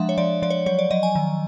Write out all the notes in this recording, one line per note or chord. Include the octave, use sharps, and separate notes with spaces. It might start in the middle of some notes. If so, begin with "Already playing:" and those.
Already playing: F3 G#3 D4 E5 F#5
C#5
F3 D5
F3 D5
C#5
F#3 C#5
D5
F#3 D#5
G#5
D#3